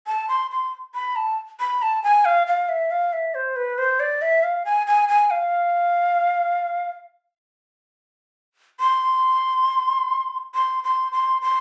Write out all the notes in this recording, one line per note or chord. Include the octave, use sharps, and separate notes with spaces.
A5
C6
C6
B5
A5
B5
A5
G#5
F5
F5
E5
F5
E5
C5
B4
C5
D5
E5
F5
G#5
G#5
G#5
F5
C6
C6
C6
C6
C6